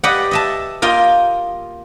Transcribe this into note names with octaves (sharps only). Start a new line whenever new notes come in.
G4 B4 D5 D#5 F#5
D#5 E5 A5
A#3 F4 D#5 G5